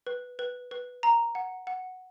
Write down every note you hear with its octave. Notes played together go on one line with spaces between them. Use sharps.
B4
B4
B4
A#5
F#5
F#5